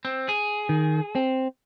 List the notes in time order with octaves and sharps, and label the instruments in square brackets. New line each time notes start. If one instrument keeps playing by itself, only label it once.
[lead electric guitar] C4
G#4
[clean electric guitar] D#3
C4